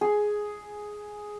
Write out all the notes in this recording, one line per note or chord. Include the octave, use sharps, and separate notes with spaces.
G#4